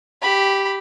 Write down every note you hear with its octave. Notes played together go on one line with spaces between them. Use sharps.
G4 B5